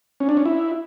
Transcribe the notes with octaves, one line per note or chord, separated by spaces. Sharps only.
C#4
D4
C#4
E4